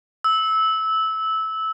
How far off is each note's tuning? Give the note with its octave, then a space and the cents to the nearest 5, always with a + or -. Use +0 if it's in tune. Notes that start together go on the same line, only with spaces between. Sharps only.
E6 -15